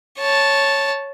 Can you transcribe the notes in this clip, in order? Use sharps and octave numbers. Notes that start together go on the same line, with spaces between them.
C#5 A5